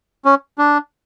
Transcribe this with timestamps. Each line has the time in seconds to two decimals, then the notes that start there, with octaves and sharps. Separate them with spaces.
0.25 C#4
0.58 D4